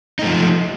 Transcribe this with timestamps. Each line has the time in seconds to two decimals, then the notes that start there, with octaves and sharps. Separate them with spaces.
0.19 D#4
0.22 A3
0.25 F3